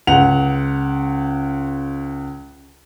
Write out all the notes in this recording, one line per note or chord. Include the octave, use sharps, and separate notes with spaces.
C#2 F#5 F7